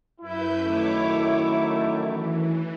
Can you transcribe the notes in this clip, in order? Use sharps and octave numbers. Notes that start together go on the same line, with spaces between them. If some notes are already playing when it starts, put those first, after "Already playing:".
F#2 E4 B4 G6
F#2 D#3 A3 C#5 D6
E3